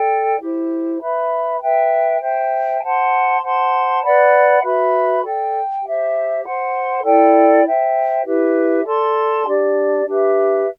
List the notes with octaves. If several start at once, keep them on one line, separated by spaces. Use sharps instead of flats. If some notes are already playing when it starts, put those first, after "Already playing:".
Already playing: A4 D5 G5
E4 G4 C5
B4 E5 B5
B4 E5 G5
C5 E5 G5
C5 F#5 A5 C6
C5 F#5 A5 C6
B4 D5 F#5 B5
F#4 B4 E5 B5
A4 D5 G5
G4 C5 E5
C5 F#5 C6
E4 A4 D5 G5
C5 E5 G5
E4 G4 B4 E5
A4 D5 A5 C6
D4 G4 D5
D4 G4 B4 E5